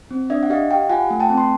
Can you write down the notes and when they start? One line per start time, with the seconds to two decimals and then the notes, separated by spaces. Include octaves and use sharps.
0.11 C4
0.30 D4 D5 E5
0.43 F#5
0.50 G4 D#5 F5
0.71 G4 F5 G5
0.90 F4 F#5 G#5
1.10 A3
1.20 G5 A5
1.30 C4
1.38 C6